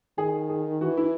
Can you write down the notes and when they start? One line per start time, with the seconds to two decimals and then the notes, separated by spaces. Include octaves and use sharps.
0.18 D#3 G#4
0.49 G#4
0.81 E3 F#4
0.97 E4